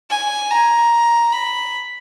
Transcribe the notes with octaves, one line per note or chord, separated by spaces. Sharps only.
G#5
A#5
B5